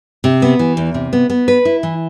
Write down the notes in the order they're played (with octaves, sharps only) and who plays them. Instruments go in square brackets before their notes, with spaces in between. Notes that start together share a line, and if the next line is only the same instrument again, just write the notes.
[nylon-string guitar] C3
B3
E3
E2
C3
B3
B3
B4
E4
E3